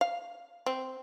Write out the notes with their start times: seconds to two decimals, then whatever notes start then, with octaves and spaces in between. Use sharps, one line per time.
0.01 F5
0.66 C4